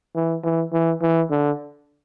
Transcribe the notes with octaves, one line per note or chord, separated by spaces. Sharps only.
E3
E3
E3
E3
D3